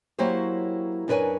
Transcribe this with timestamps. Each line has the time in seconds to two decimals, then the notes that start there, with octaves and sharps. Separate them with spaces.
0.19 F#3 A#3 E4 G4 C5 C#5
1.08 F#2 D4 A#4 B4 C#5 G#5